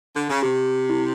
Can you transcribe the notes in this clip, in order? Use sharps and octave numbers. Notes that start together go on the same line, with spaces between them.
D3
C#3
C3 G4
E4